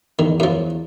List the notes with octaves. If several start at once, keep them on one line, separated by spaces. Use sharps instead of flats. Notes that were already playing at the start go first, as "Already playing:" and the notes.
E2 D#3
F#2 F3